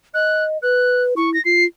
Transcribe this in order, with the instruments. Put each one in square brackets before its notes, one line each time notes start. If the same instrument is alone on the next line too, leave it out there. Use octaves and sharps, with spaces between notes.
[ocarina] D#5 [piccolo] F#6
[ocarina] B4 [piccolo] F#6
[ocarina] E4 [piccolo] C#6
[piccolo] A#6
[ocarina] F4 [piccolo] C7